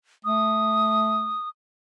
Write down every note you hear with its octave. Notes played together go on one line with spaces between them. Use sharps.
A3 D#6